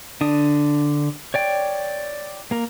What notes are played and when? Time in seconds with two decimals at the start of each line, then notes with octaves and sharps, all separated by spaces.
0.21 D3 D4 D#6
1.34 C#5 D5 G5
2.51 A#3 A#4